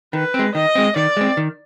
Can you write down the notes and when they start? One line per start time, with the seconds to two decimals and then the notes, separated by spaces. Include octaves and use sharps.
0.13 D#3 B4
0.34 G#3 C4
0.55 D#3 D#5
0.75 G#3 C4
0.96 D#3 D5
1.17 G#3 C4
1.37 D#3